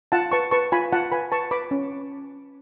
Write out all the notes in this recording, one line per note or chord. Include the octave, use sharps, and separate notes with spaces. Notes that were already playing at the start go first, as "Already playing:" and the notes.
F4 F#5 A5
B4 A5 C#6
B4 A5 C#6
F4 G#5 B5
F4 F#5 A5
B4 G#5 B5
B4 A5 C#6
B4 B5 D6
C#4